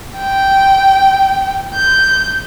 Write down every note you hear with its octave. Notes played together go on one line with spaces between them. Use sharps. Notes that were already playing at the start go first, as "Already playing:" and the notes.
G5
G6